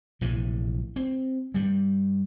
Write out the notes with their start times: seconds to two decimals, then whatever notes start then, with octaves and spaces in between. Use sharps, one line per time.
0.21 A#1 A2 C3 E3
0.96 C4
1.54 G2 G3